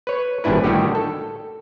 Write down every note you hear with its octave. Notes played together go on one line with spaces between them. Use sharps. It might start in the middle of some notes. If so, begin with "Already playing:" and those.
B4 C#5
G#1 G2 A#2 D4 E4 B4
A2 D3 D#3 G3 F#4 G4
A4